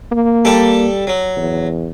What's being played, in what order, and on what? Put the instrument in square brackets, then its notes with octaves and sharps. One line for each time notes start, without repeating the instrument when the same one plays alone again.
[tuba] A#3
[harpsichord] G3 A4 A5
F#3
[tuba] E2